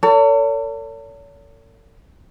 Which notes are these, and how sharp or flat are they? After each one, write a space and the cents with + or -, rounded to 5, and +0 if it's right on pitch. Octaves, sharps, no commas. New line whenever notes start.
A4 +45 C#5 +40